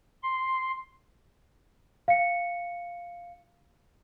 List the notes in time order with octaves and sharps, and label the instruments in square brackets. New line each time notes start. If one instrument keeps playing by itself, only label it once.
[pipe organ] C6
[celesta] F5 C#7